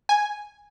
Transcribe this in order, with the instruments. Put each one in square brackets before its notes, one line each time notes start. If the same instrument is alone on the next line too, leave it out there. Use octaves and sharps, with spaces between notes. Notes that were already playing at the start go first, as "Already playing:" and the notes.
[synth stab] G#5